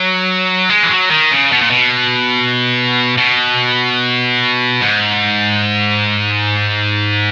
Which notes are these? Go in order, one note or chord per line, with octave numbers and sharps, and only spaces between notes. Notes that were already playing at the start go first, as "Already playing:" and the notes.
Already playing: F#3
G#3
E3
F#3
D#3
C#3
B2
A#2
B2
B2
G#2